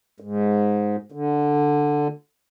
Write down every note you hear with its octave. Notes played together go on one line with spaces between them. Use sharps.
G#2
D3